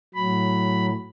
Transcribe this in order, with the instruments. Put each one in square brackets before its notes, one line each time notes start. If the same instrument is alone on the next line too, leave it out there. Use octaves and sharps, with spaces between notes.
[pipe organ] A2 F#3 B5